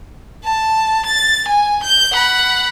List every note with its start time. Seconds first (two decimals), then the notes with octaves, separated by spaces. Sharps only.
0.44 A5
1.06 A6
1.48 G#5
1.83 G6
2.12 F#5 B5